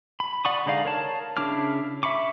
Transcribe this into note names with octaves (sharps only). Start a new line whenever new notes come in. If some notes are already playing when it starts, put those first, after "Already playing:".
B5
D5 F#5 B5 C#6 D#6
D3 G#3 D#4 D5 F5
A#4 C#5 A5
C#3 D4 E4 D6 F6
E5 B5 C#6 D6